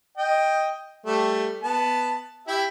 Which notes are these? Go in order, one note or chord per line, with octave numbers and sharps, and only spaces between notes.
D#5 G5
G3 A3
B3 A5
E4 G4 E5